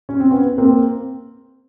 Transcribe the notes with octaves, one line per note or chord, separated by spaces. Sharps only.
C#4
C4
B3 C#4
A#3 C4